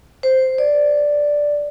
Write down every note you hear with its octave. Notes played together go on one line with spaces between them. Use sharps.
C5
D5